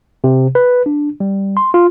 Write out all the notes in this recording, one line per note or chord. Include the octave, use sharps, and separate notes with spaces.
C3
B4
D4
G3
C6
F4